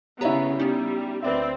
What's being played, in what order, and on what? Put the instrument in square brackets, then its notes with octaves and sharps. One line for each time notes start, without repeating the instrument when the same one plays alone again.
[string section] C#3 B3 [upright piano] E4 A#5 [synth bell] G4 C#5 E5
[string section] G3 [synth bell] B3 C#4 D#4
[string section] D2 C4 [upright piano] B4 D5 E5